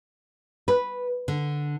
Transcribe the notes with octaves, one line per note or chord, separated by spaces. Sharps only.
B4
D3